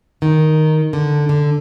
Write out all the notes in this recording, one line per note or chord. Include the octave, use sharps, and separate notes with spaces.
D#3
D3
D3